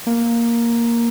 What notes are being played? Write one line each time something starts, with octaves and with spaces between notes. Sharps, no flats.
A#3